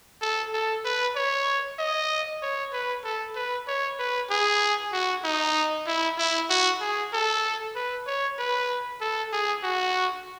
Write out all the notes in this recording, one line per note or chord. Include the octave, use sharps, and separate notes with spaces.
A4
A4
B4
C#5
D#5
C#5
B4
A4
B4
C#5
B4
G#4
F#4
D#4
E4
E4
F#4
G#4
A4
B4
C#5
B4
A4
G#4
F#4